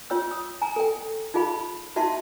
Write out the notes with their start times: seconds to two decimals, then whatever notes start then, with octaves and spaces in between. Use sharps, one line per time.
0.10 F4 C#5 G5 E6
0.31 D#6
0.62 G#5 A#5
0.76 A4 G5
1.34 D#4 F4 G#4 F5 B5
1.96 D#4 F#4 E5 F5 A5 C6